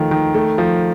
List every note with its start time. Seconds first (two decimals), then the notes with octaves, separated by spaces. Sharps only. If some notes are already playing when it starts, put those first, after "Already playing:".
Already playing: D#3 F3 A3
0.11 D#3
0.34 A3
0.58 F3